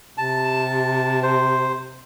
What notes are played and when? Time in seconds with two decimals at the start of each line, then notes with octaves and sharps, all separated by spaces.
0.18 C3 A5
1.23 C5